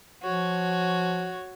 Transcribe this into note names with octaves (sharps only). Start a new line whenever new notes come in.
F3 F#4 C#5